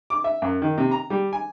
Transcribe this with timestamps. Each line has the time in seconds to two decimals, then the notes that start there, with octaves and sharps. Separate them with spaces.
0.10 D6
0.24 E5
0.42 F#2
0.62 D#3
0.78 C3
0.91 A#5
1.10 G3
1.33 G#5